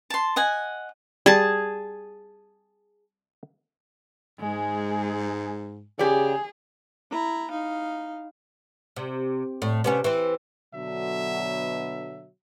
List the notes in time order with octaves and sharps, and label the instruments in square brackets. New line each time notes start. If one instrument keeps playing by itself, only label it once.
[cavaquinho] A5 C6
D#5 F#5 G#5
[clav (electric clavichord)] G3 [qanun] G#4 A5
[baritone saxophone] G#2 [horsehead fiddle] G#3 G#4
[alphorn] C#3 [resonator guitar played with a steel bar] G4 D5 [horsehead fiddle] G#4
[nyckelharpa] E4 A#5
D#4 F5
[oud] C3
A2
C3 B3 C#4
E3 C4
[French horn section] B2 D3 F#3 [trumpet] E5